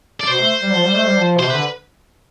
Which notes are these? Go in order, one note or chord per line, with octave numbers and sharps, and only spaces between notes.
D5
B2 C5
A3
G3
F3
G3
A3
G3
F3
B2 C5
C3
D3 B4